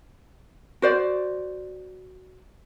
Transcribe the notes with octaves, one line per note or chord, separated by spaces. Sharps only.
F#4 C5 D5